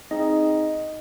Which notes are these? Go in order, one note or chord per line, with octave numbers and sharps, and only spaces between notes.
C4 D#4 G#4 D#5